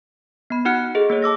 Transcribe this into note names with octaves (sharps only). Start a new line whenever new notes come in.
B3 B5
D#4 F#4 F#5 F6 F#6 C#7
F#5
G#4 A4 D#5
A#3 G#4 C#5
A5 D6 E6 A#6